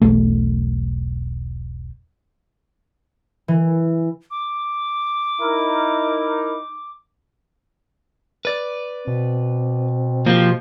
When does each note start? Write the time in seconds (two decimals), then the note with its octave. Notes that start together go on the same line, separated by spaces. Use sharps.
0.01 E1 B1 A3
3.48 E3
4.31 D6
5.41 D#4 E4 A#4
8.45 B4 D5
9.07 B2 C4
10.26 F3 A#3 G4